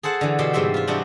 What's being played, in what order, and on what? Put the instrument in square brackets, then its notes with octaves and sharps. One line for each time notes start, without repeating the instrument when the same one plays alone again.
[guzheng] G#4 A4 C5 F#5 A5
D3 E3
B2 G4 C5 G5 A5
G#2 C3 G3 C5 E5 G5
F4 E5
C3 E3 G3 D4 D#4 F#4